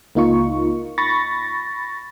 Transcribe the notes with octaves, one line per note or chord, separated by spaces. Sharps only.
C#2 A#3 D#4 F4 C#6
B5 C#6 A6 A#6